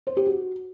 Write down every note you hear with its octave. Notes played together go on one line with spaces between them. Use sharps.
C5
G4
F#4